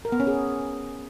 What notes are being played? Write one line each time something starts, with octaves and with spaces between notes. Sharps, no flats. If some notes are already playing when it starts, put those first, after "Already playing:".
A#4
B3
C#4
G#4